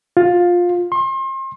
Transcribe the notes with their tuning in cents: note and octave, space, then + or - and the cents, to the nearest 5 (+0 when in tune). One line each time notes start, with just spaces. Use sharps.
F4 +15
C6 +35